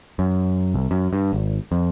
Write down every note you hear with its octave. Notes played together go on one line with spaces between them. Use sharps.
F#2
C2
F#2
G2
G#1
F2